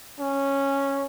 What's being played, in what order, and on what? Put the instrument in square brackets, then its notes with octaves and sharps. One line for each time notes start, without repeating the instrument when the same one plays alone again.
[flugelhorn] C#4